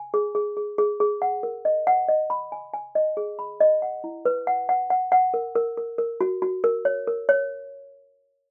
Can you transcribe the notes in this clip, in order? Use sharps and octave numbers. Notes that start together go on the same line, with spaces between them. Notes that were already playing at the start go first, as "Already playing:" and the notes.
Already playing: G#5
G#4
G#4
G#4
G#4
G#4
F#5
A#4
D#5
F#5
D#5
B5
G#5
G#5
D#5
G#4
B5
D#5
F#5
E4
B4
F#5
F#5
F#5
F#5
A#4
A#4
A#4
A#4
F#4
F#4
A#4
C#5
A#4
C#5